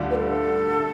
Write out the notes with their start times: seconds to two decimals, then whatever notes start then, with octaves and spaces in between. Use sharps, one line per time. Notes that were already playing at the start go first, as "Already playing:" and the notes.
Already playing: D2 D3 G3 D4 F4
0.10 B4
0.15 A4
0.78 A3